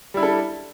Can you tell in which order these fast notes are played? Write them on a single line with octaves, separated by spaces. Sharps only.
G3 E4 D4 A4